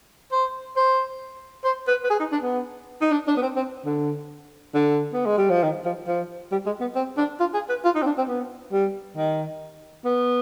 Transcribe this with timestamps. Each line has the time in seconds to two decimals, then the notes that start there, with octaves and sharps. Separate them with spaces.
0.32 C5
0.76 C5
1.64 C5
1.87 B4
2.04 B4
2.10 G#4
2.19 D#4
2.32 D4
2.42 B3
3.01 D#4
3.12 D4
3.27 D4
3.36 B3
3.42 C4
3.56 C4
3.85 D3
4.74 D3
5.13 B3
5.26 G#3
5.38 G3
5.50 F3
5.63 D#3
5.85 F3
6.07 F3
6.52 G3
6.66 G#3
6.80 B3
6.95 C4
7.17 D4
7.40 F4
7.54 G#4
7.69 B4
7.84 F4
7.95 D#4
8.02 C4
8.06 D4
8.17 C4
8.28 B3
8.72 G3
9.17 D#3
10.05 B3